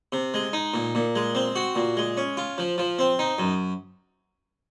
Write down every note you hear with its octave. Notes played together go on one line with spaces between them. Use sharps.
C3
G#3
D#4
A#2
A#2
G#3
C4
F#4
A#2
G#3
C#4
F4
F3
F3
C4
D#4
F#2